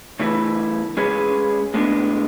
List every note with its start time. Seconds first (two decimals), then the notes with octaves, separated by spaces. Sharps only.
0.19 C#3 E3 A3 E4 B4
0.97 G#3 C#4 G#4 B4
1.74 A2 G#3 B3 D4